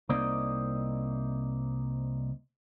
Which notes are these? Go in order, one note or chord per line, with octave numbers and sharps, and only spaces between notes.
C2 A#3 C4 D#4 D5 D#5